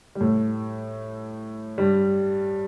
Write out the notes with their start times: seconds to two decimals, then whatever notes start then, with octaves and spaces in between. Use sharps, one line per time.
0.15 G3
0.20 A2 A3
1.78 G2 G3